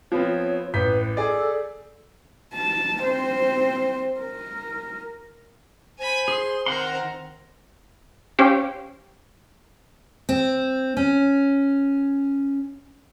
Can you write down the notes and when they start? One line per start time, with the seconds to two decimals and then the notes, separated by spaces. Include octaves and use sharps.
0.12 F3 B3 C4 C#5
0.74 A1 B4 G6 B6
1.17 G#4 A4 D5
2.55 A5
3.03 C4 C5
4.20 A#4
5.99 C5 G#5 B5
6.28 G#4 C6
6.66 D#3 C4 A#4 F#5 C6
8.39 C#4 G4 C5 C#5 F5 G5
10.29 C4
10.97 C#4